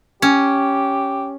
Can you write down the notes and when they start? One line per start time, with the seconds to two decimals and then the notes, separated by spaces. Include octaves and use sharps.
0.22 C#4 G4